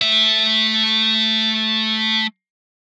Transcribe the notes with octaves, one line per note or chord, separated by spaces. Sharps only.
A3 E5